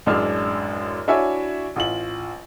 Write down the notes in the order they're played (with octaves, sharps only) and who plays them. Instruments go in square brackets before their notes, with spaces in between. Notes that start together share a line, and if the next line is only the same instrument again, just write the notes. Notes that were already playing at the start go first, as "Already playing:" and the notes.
[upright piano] A1 F#2 G#3 D4 E6 F6
D4 E4 F#4 C#5 E5 G#5
A1 F4 F#7